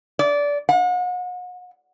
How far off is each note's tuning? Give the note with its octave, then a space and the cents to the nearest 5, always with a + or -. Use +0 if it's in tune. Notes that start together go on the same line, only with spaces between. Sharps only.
D5 -20
F#5 -40